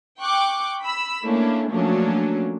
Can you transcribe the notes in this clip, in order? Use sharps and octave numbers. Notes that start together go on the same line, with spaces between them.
G5 C#6 D6 F#6
B5 E6
A3 A#3 C#4 D4 E4
F3 F#3 A3 A#3 C#4 D4